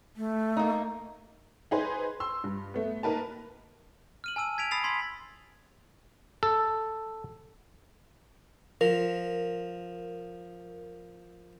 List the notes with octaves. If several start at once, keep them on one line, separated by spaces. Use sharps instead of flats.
A3
A#3 D#4
D#4 G#4 B4 C5
C6 E6
G2
A3 B3
A#3 D#4 A#4 B4 A5
F6 D#7 F#7
G#5 A5 E6 D#7 F#7
G#6 B6 D7 F7
B5 D#6 A6 C7 F7
C6 G#6 B6 F#7
A4
F3 A#4